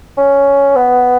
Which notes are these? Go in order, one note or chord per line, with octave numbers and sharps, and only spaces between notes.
C#4
B3